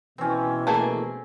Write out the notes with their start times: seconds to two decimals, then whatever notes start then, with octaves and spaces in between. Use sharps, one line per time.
0.18 B2 E3 C4 C#4
0.67 A3 A#3 G#4